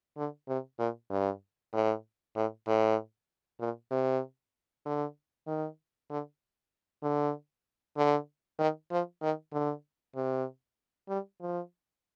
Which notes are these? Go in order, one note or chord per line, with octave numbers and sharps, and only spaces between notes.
D3
C3
A#2
G2
A2
A2
A2
A#2
C3
D3
D#3
D3
D3
D3
D#3
F3
D#3
D3
C3
G3
F3